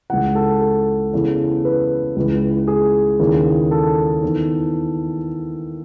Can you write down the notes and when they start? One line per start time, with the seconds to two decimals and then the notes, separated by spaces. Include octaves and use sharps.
0.10 C#2 C#3 E3 F#5
0.35 A4
0.61 A4
1.13 E2 C#3 E3
1.65 B4
2.16 C#2 C#3 E3
2.68 G#4
3.19 D#2 C#3 E3
3.71 A4
4.23 E2 D#3